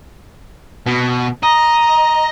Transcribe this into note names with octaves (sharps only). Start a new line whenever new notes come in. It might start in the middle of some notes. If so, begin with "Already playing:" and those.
B2
D#5 A#5